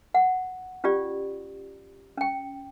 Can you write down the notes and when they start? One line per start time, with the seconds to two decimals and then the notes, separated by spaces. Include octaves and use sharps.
0.14 F#5
0.84 C#4 F4 G4 D5
2.17 C#4 G5